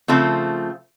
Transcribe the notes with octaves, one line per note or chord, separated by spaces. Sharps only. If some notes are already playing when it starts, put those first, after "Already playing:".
C#3 F3 A3 C4 F4